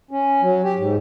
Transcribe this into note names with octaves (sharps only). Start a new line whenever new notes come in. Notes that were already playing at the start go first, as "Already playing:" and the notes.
C#4
F#3
G4
G#2